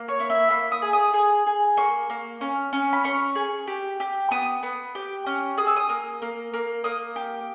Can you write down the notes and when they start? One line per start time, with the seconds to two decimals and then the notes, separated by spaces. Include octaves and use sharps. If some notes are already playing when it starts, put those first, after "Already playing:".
Already playing: A#3
0.08 C#5
0.20 E4
0.30 E5
0.50 A#3 B5
0.72 D#6
0.82 G#4
0.93 D#6
1.14 G#4
1.47 G#4
1.77 A#3 C#6
2.10 A#3
2.41 C#4
2.73 C#4
2.93 B5
3.04 C#4 C#6
3.35 G#4
3.67 G4
4.00 G4
4.31 B3 D#6
4.63 B3
4.95 G4
5.26 C#4
5.57 G#4 D#6
5.67 E6
5.76 D#6
5.89 A#3
6.22 A#3
6.54 A#3
6.84 A#3 D#6
7.16 G4